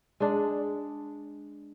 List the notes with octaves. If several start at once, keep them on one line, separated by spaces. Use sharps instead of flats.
G#3 D4